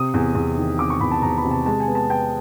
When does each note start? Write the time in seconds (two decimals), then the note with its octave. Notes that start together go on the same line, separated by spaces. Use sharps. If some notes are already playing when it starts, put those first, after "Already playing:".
Already playing: C3 D#6
0.14 E2
0.35 E2
0.57 D#3
0.78 C3 D6
0.90 C#6
1.00 E2 B5
1.11 A5
1.22 E2 A#5
1.38 B5
1.45 C3
1.51 A5
1.66 G#3 A5
1.80 G#5
1.88 B3
1.95 A5
2.10 B3 G5